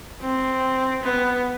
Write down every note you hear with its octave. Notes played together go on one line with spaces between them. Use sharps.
C4
B3